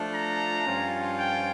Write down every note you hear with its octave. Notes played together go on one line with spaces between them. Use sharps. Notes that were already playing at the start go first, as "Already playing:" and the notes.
Already playing: F3 A3 D4 F4
A#5
G2 F3 C#4 F4
G5